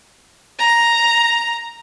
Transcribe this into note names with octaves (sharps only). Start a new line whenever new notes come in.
A#5